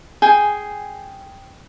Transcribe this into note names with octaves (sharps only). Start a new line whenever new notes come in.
G#4 G5 G#5